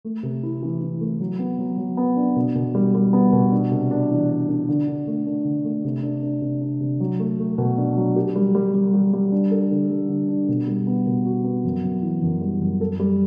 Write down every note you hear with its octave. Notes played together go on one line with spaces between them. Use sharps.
A3
C3
E4
E3
E3
A3
F#3
B3
F#3
F#3
B3
D4
B2
B2
G3
G3
B3
B2
D4
C3
D4
E3
D4
D4
D3
D3
A3
D4
D3
A3
C3
D4
D4
C3
D4
C3
F#3
A3
A3
B2
D4
F#3
G4
G3
G3
G3
G3
G3
D4
A4
D3
G3
D3
D4
B2
G3
B3
B2
F#4
B3
F#2
F#2
E3
F#2
G3
F#2
A4
G3